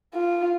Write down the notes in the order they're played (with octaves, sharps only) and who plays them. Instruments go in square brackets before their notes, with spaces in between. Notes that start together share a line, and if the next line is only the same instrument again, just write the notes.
[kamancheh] F4